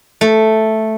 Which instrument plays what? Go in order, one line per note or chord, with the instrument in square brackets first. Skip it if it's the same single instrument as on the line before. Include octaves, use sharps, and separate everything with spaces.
[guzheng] A3